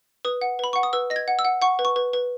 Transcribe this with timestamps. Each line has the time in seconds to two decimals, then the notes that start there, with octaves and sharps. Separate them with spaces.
0.25 B4 D#6
0.42 F#5
0.59 B4 B5
0.73 F#5 C#6
0.83 D#6
0.93 B4 E6
1.10 D#5 A#6
1.16 G#6
1.28 F#5
1.39 E6
1.45 F#5
1.62 F#5 C#6
1.79 B4
1.85 C#6
1.96 B4
2.13 B4